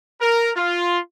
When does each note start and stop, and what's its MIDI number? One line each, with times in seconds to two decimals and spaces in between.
0.21 0.50 70
0.56 1.00 65